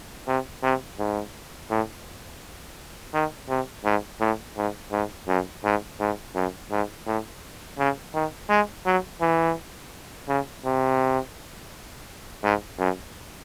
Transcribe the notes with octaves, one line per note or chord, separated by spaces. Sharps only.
C3
C3
G#2
A2
D#3
C3
G#2
A2
G#2
G#2
F#2
G#2
G#2
F#2
G#2
A2
C#3
D#3
G#3
F#3
E3
C#3
C3
G#2
F#2